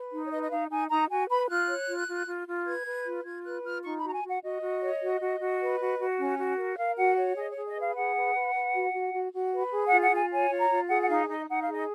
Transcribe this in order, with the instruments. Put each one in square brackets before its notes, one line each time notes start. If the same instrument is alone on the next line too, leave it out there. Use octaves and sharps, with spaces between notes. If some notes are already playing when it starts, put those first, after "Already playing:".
Already playing: [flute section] B4
D#4
C#5
B4 D#5
D#5
D#4 F5
D#4 G#5
D#4 A#5
F#4 G#5
B4 B5
F4 F#6
C#5
F4
F4
F4
F4
B4 G#6
B4
F4
F4 G#6
B4 F#6
F4 F6
D#4 C#6
B5
F#4 A#5
G#5
F#4 F#5
F#4 D#5
F#4
C#5
F#4
F#4
F#4
B4
F#4
F#4
C#4
F#4
A#4
A#4 F5
F#4 F#5
C#5
G#4 D#5
C#5
G#4
D#5
B4 F5
G#4 F#5
B4
B4
B4
F#4
F#4
F#4
F#4
B4
G#4
F4 F#5
F#5
F4 G#5
C#5 G#5
F4
A#5
F4
G#4 F#5
F#5
D#4 F5
D#4 D#5
D#4 F#5
F5
G#4 D#5